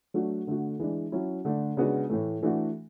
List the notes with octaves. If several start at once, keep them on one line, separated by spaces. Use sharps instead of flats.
F#3 A3 D4 F#4
D3 A3 D4 F#4
E3 G#3 D4
F#3 C#4 E4
D3 A3 D4
C#3 G#3 B3 D4 F#4
A2 E3 A3
E3 A3 D4 F#4